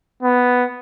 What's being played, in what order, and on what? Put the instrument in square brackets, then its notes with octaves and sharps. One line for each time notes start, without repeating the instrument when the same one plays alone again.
[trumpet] B3